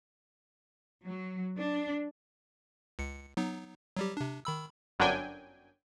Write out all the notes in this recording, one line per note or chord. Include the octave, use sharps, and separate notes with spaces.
F#3
D4
C#2 C#7
F#3 B3 D#4
F#3 G3 G4
C3 D4
D#3 B5 E6
G1 F#2 F#3 D4 G5 G#5